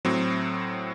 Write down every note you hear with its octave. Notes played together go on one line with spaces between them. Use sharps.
A2 F#3 C4